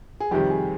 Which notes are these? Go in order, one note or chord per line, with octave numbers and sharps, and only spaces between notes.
G#4
F2 C3 D#3 G3 G4
G#4